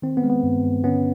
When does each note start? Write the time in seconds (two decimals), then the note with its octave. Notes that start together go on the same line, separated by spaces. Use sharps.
0.02 D#3 C4
0.17 B3
0.23 G#3
0.30 B3
0.43 G2
0.64 G2
0.84 D3 B3 C#4